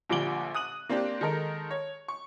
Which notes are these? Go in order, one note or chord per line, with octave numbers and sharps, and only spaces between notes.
A#1 A#2 D3 G3 D7 G7
D#6 F#6 D#7 F#7
A#3 C4 D4 G4
D#3 G#3 D#4 A4 A#4
C#5
C#6